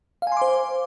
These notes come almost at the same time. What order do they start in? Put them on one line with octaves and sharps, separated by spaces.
F5 G#5 C6 D6 C5